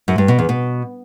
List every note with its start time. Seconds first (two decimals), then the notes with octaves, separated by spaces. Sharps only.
0.08 F#2
0.18 G2
0.28 B2
0.39 E2
0.49 B2